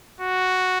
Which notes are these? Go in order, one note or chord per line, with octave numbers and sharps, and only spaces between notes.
F#4